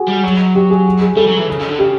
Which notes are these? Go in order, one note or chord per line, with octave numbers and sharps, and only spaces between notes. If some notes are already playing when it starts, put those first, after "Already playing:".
Already playing: F#4 G#4
G3
F#3
G4
G#4
G#4
G3 A4
F#3
E3
C#3
C#3
D3
C#3 G4